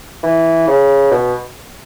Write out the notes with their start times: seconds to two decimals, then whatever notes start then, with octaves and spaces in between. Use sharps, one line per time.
0.23 E3
0.68 C#3
1.11 B2